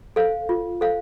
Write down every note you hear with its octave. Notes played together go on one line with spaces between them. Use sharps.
A4 C5 F5
F4
A4 C5 F5